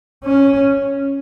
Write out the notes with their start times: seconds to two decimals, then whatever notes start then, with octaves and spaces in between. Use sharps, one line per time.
0.25 C#4